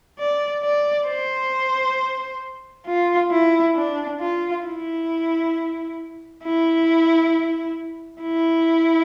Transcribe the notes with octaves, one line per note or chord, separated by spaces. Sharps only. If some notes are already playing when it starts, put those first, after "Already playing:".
D5
D5
C5
F4
E4
D4
F4
E4
E4
E4